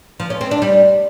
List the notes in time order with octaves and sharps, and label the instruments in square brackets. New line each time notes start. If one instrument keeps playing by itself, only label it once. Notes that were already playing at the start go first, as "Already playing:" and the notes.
[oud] F3
C#4
C4
D4
G3